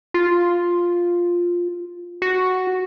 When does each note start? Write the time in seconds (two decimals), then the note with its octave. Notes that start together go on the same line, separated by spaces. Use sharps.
0.14 F4
2.22 F#4